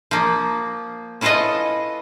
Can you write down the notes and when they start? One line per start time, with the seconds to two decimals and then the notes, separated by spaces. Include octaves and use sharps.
0.11 F3 A#3
1.21 C#4 E4 F4 A4 B4 D#5